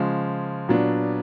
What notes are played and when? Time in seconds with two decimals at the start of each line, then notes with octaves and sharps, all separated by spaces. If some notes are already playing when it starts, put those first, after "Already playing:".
Already playing: C#3 F3 G#3
0.68 A#2 F#3 B3 D4